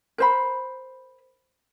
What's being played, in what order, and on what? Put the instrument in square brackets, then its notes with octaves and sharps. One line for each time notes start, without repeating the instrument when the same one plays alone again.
[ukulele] A#4 C5 B5